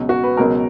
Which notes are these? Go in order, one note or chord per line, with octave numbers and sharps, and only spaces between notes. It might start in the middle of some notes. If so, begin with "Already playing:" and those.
Already playing: C#2 B2 F#3
F#4
B4
C#2 B2 F#3 A#4